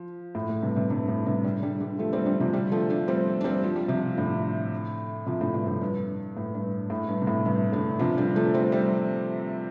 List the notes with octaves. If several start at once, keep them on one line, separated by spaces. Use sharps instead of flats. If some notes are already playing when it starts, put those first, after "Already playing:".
Already playing: F3
A2
A2
G2 C3
G2 C3
G2 C3
A2
G2 C3
D3 G3
D3 G3
D3 G3
F3 A3
G3 C4
D3 G3
C3 F3
D3 G3
F3 A3
A3 D4
G3 C4
D4
G3 C4
F3
G3
C3 F3
A2 D3
C3 F3
A2 D3
G2 C3
A2
G2
A2
G2
A2
G2
C3
A2
G2 C3
A2 D3
C3 F3
D3 G3
F3 A3
G3 C4
G3 C4